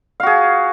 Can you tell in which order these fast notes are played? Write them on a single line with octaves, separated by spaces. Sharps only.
F5 F#4 G#4